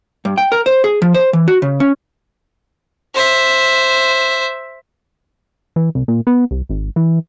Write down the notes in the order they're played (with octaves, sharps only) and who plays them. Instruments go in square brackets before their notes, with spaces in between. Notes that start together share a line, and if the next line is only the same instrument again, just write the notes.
[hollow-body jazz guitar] G2
G5
A#4
C5
G#4
F3
C5
E3
F#4
C#3
C#4
[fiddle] C5 E5
[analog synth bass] E3
C2
A#2
B3
C2
G#1
E3